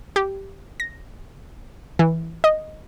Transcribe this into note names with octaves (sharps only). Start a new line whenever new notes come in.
G4
A#6
E3
D#5